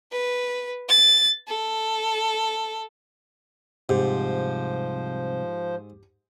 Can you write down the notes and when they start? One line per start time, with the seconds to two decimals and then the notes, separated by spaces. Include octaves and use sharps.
0.12 B4
0.89 A6
1.48 A4
3.89 C2 G#2 C3 F3 G4 C5